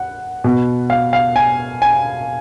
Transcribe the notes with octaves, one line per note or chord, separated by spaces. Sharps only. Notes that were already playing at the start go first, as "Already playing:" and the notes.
Already playing: F#5
B2
F5
F5
G#5
G#5